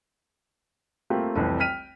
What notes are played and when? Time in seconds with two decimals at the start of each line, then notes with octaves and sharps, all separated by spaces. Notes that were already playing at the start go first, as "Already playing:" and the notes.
1.10 A3 A#3 C4 F4 G4
1.35 F1 C2 E3
1.60 G5 F6 B6 D#7 F7